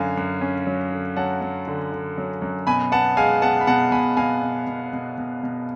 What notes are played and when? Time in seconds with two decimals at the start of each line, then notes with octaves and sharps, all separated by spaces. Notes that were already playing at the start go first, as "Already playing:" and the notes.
Already playing: F#2 D3 F5 G#5
0.17 F#2
0.41 C#4
0.67 F#3
0.92 D3
1.16 F#3 F#5 A5
1.41 F#3
1.68 D3
1.92 D3
2.18 F#3
2.42 F#2
2.67 B2 G#5 B5
2.92 B3 F#5 A5
3.17 G#3 F5 G#5
3.42 B3 F#5 A5
3.61 B5
3.67 B2 F#5 A5
3.92 B2 G#5 B5
4.17 B2 F5 G#5
4.42 B2
4.67 B2
4.93 B2
5.18 B2
5.43 B2